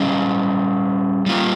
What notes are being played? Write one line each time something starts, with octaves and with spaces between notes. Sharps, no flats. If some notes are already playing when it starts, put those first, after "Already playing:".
Already playing: G3 C#4 G#4 D#5
G3 A#3 F4